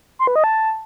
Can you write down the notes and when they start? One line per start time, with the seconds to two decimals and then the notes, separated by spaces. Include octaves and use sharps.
0.19 C6
0.27 B4
0.36 D#5
0.44 A5